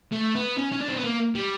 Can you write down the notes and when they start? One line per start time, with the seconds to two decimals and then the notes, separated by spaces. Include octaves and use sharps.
0.12 A3
0.35 B3
0.58 C#4
0.72 C#4
0.81 D4
0.89 C4
0.97 B3
1.04 A#3
1.35 G3